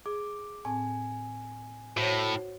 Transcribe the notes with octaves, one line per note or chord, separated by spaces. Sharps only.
G#4 D6
A2 C4 G#5 A5
A2 F#4 C5 C#5